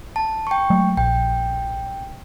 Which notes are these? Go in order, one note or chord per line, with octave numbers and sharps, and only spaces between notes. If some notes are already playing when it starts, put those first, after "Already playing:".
A5
G5 C#6
F#3 G#3 A3
A#1 G5